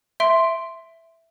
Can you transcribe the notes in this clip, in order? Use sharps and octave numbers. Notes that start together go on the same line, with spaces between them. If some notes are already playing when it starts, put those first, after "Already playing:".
E5 C6 D7